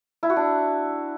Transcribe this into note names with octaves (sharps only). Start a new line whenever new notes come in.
E4
F#4
D4